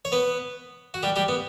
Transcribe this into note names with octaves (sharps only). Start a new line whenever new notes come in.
C#5
B3 B4
F#4
G3 G4
G3 G4
B3